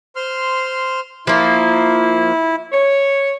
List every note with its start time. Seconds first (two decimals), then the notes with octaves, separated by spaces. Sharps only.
0.16 C5 C6 F6
1.27 F3 A#3 E4
2.72 C#5